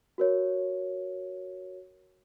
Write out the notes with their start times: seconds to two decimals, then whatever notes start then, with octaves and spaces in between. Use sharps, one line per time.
0.18 F#4 A#4 C#5